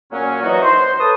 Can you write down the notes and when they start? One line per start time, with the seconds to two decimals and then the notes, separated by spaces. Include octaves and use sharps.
0.12 A#2 F#3 C#4
0.43 E3 F#3 D#4 F#4
0.62 C5
1.00 A4 B4 C#5 A5 D#6